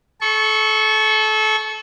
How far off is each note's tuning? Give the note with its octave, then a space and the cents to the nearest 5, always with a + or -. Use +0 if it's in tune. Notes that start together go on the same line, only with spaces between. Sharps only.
A4 -25 C#6 +0